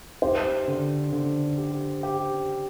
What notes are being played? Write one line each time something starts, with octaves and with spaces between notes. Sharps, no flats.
G4 C5
D3
D3
G4
G4